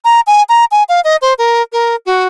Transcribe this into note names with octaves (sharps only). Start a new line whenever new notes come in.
A#5
G#5
A#5
G#5
F5
D#5
C5
A#4
A#4
F#4